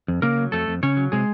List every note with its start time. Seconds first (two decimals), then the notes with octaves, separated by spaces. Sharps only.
0.08 F2
0.22 C#3 A#3 A#4
0.37 F#3
0.52 F2 A3 A4
0.68 F2
0.83 C#3 C#4 C#5
0.97 F#3
1.12 C3 G#3 G#4